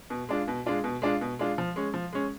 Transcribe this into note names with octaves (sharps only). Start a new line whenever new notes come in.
B2
G#3 D4 F4
B2
G#3 D4 F4
B2
G#3 D4 F4
B2
G#3 D4 F4
F3
G#3 C#4
F3
G#3 C#4